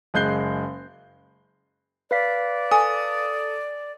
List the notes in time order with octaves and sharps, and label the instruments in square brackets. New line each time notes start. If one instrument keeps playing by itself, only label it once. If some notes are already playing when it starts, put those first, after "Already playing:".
[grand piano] F#1 G#3 F#6 G6 C7 G7
[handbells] B4 F5 B6 [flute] D5
[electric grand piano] A4 D#6 [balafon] G#5